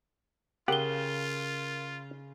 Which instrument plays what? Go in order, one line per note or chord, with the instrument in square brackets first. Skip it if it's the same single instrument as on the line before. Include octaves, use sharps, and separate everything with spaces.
[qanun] C#3 [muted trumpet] F4 [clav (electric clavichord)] G4 F#5 [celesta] A#4 G7